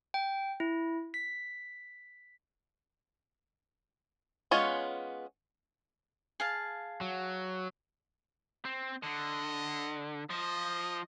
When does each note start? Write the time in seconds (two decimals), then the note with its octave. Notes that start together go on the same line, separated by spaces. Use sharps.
0.14 G5
0.60 E4
1.14 B6
4.51 G#3 B3 C#4 F4 C#5
6.40 G#4 F5 A5
7.01 F#3
8.65 C4
9.03 D3 D#5
10.30 F3 D#5